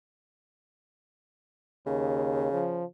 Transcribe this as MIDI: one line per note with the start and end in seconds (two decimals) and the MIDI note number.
1.86 2.48 39
1.86 2.86 49
2.53 2.85 53